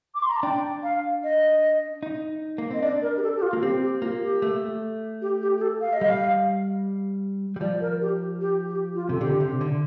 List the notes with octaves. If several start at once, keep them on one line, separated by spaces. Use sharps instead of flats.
D6
C6
A#5
A5
D4 G5
F5
D#5
D#4
A#3
C4 D#5
D4 D5
A#4
G4
A4
G4
F4
A#3
C4 G4
G4
A#3 F4
G4
A3
G4
G4
G4
A4
F5
D#5
G3 F5
G3
F3 D5
A#4
G4
G4
G4
F4
C3 A4
D3 G4
C3
D3